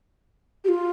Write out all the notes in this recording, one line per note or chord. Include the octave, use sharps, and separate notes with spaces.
G4
F4